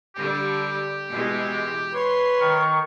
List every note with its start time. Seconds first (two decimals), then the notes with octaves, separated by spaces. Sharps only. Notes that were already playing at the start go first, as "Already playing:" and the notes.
0.16 D3 G3 G4
1.09 B2 E3 G#3
1.95 B4 C#5 C6
2.40 D#3 A#4 C#6